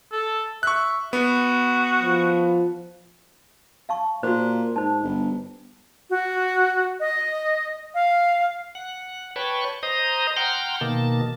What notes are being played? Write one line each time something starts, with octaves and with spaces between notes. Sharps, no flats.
A4
E5 C#6 F#6
B3 F#4
F3
F5 A5 C#6
A#2 F#4 C5
G#2 C5 A5
G1
F#4
D#5
F5
F#5
B4 C#5 G5 A5 B5 C#6
C5 D#5 A#5 D#6
F#5 G5 A#5 C6 F6 G6
B2 D#3 A#3 A5